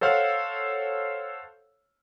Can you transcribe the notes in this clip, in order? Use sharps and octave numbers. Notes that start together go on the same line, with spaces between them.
A4 C5 C#5 F5 F#5